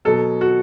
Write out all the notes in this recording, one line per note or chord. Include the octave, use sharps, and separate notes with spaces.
B2 F#3 A4
F#4